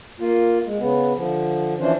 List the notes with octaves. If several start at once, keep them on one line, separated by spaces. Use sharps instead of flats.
A#3 F4
G#3
C#3 B3
D3 F3
E3 F3 C#4 D4 C5